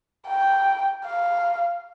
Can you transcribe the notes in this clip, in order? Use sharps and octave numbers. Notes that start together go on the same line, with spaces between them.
G5
F5